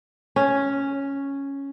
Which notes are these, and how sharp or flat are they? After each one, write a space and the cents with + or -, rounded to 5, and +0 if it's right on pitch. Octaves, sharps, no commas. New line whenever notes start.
C#4 +0